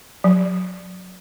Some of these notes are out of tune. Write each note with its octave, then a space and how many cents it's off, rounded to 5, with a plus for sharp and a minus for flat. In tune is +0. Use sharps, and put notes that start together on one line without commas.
F#3 -15